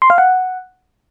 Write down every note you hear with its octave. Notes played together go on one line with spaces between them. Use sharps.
C6
F5
F#5